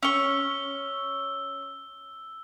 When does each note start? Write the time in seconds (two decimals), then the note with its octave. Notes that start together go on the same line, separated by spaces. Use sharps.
0.03 C#4 C#6 E6 G7